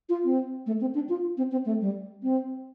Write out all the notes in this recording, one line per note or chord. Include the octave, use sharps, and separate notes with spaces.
F4
C4
A3
C4
D4
F4
C4
C4
A3
G3
C4